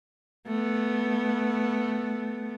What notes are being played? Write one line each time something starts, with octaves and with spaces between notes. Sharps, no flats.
A3 B3